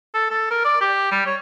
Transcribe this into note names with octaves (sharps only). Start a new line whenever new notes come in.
A4
A4
A#4
D5
G4
G3
C#5